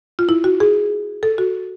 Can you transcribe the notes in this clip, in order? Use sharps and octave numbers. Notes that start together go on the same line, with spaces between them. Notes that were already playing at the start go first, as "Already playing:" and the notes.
F4
E4
F#4
G#4
A4
F#4